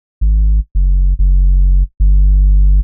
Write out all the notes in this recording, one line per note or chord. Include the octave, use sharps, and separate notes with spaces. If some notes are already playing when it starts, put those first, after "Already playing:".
G#1
F#1
F#1
G1